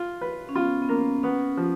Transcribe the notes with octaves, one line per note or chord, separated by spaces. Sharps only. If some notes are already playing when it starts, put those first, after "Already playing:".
Already playing: F4
B4
C#4
B3 F4
B3
A#3 C#4
B3 C#4
F3